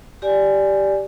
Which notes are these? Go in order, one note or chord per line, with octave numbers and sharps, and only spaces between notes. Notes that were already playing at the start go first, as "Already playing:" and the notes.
G4 D5 G#5